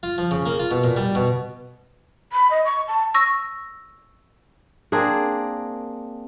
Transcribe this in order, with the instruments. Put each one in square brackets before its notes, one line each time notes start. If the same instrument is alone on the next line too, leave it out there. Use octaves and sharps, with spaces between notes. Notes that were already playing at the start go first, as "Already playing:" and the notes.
[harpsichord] F4
F3
C#3
A#3
F4
B2
A#2
G3
B2
[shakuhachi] B5
D#5
C#6
A5
[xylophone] C#6 E6 A#6
[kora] A#3 C4 D4 G#4